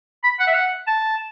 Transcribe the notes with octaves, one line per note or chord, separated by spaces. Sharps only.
B5
F#5
E5
F#5
A5